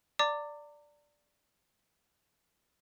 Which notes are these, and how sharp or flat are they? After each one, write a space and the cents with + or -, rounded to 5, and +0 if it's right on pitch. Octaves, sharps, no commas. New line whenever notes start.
D5 +0 A#5 -35 D6 +0